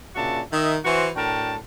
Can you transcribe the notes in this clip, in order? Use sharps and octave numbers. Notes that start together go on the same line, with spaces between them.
A#2 C#3 D4 F#4 E5 A5
D#3 D#5 E5
E3 F#4 C5
A2 D4 F#4 A#4 G5 A5